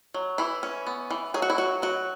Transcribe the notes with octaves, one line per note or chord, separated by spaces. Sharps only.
F#3
E3 E4
C#4
B3
E3
F#3 G#4
F#4
E4
F#3 F#4
F#3 F#4